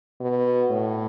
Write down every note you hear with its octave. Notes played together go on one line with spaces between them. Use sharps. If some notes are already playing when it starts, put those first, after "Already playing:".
B2
A2